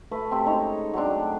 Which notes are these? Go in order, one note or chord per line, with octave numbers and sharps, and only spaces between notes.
A3 B4
C3 C4
G#3 C#4 D#4 C#5
F#3 A3 C4 D4